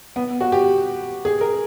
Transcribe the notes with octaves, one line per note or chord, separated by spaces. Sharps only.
B3
F#4
G4
G#4
A#4